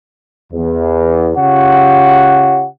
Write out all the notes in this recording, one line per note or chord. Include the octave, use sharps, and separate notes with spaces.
E2
C#3 F4 G4 C#5 F#5